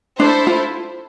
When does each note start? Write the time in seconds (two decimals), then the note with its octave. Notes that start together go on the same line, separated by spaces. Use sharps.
0.20 D4 E4 A4 C5
0.47 F4